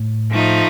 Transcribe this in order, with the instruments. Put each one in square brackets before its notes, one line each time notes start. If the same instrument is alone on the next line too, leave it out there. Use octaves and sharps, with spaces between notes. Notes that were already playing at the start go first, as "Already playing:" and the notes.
Already playing: [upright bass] A2
[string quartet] F3 A3 D#4